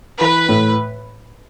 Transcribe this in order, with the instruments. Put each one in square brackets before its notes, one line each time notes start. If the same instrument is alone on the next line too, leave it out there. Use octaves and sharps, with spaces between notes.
[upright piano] E3 [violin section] B4
[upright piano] A2